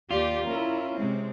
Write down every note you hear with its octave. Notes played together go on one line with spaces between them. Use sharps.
D#2 F4 G4 D5
C#4 E4 A#4
C3 G#3 C4